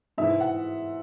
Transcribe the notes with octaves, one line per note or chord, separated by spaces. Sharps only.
G#2 E3 E5
F#5